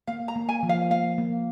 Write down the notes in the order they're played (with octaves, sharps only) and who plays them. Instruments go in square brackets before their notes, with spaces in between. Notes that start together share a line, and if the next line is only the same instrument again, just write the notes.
[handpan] A#3 [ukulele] F5
[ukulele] A#5
[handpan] A#3
[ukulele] G#5
[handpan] F3
[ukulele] F5
[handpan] A#3 [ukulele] F5
[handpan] A#3